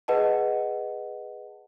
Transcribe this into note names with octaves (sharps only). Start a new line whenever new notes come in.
G#4 B4 D#5 F#5 A5